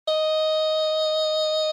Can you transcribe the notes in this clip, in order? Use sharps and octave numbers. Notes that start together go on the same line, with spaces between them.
D#5